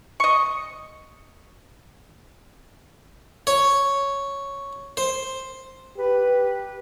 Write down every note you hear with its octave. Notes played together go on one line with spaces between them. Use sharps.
D#5 C#6
C#5
C5
G4 B4